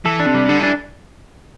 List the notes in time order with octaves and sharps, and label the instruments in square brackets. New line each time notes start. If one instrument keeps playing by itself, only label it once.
[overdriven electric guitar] E3 [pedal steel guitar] A4
[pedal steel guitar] D4
[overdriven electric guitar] C3
[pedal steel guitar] G3
[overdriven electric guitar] D3 [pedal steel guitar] A4
[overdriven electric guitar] E3 [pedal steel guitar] D4